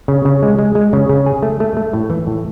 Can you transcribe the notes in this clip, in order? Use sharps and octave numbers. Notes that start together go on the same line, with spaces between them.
C#3
C#3
G#3
G#3
G#3
C#3
C#3
G#4
A3
A3
A3
A2
E3
A2